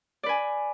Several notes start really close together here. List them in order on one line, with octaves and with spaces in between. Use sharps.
D5 B4 G#5